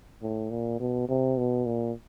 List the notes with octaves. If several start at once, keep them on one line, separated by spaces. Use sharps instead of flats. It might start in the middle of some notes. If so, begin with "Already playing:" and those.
A2
A#2
B2
C3
B2
A#2